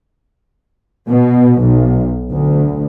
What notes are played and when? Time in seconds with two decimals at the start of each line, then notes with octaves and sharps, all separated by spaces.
1.09 B2
1.62 B1
2.32 D2